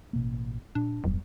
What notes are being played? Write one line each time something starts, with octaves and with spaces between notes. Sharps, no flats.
A1 B2 A#3
A#2 D4
D1 E2 G2 F#3